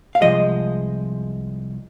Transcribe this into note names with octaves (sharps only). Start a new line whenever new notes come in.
F5
C2 A#2 F3 G#3 D#5